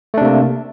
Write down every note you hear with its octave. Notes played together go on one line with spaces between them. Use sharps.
C3 A3 A#3 D4